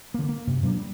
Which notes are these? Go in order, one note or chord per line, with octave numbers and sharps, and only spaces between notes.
D3 A#3
A#3
F#2 C3
B2 F#3 A#3 D4
G3